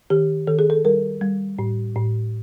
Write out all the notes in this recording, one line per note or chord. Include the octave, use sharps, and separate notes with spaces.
D#3 G4
D#3 A4
G#4
A4
G3 A#4
G3
A2
A2